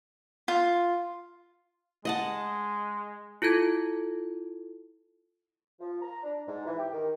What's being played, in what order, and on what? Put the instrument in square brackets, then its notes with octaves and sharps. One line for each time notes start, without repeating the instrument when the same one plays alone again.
[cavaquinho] F4
[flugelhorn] G#3 [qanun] D#5 F#5 A5
[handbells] E4 F4 A4 G#6
[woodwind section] F3
A#5
D4
G#2
E3
G4
D#3